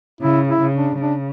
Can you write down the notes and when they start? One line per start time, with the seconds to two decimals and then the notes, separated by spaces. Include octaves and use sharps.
0.21 C#3 E4
0.47 E4
0.61 C#3
0.75 D4
1.01 C#3 D4